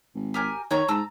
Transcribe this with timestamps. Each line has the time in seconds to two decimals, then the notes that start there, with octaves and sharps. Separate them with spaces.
0.15 G#1
0.34 G4 A#4 G#5
0.71 D#3 C#5 A#5 C#6
0.88 G#2 A5 A#5 E6